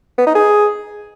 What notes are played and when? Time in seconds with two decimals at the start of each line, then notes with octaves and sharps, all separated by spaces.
0.18 B3
0.27 D#4
0.35 G#4